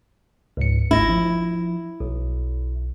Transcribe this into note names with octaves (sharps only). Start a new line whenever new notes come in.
C#2 G#2 C#7
G1 E4 A#6
F3
B1